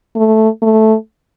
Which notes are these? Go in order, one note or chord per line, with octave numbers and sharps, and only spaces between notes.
A3
A3